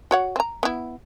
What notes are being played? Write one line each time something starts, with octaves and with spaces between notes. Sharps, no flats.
F#4 C#5 F#5
C4 A#5
B3 E4